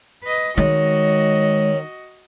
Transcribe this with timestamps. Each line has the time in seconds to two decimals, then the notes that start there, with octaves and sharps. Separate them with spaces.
0.23 B4 D#5
0.58 D#3 G#3 F#4 C#5 D#5